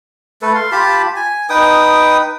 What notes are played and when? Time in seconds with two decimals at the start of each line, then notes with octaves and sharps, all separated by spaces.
0.42 A3 A4 B4
0.55 F5 C6
0.72 F4 G4 A5 B5
1.16 G#5
1.49 D#4 B4 G5 D#6